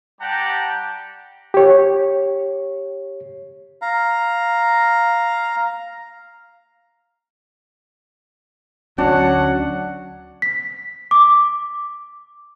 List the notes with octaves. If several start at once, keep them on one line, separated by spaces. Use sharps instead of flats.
G3 G4 F#5 G5 A5 A#5
G4 C#5
F5 A#5
D2 F#3 C#4 D4 F#5
B6
D6